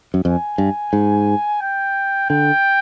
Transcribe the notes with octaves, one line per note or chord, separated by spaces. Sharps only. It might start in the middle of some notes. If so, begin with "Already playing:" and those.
F#2
F2 G#5
G2
G#2
G5
D3 G5